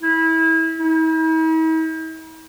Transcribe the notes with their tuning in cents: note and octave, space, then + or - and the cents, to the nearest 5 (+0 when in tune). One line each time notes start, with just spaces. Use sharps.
E4 -25
E4 -45